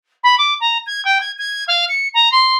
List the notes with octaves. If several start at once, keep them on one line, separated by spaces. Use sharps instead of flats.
B5
D6
A#5
G#6
G5
G#6
G#6
F5
C#7
A#5
C6